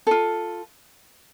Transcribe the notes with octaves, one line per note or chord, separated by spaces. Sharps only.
F4 A4